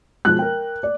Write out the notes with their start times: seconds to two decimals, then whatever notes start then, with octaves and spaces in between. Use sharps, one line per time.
0.25 B2 F3 G#3 F#6
0.39 A#4 G5
0.83 D5